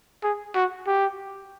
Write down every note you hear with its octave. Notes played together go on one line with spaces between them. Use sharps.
G#4
F#4
G4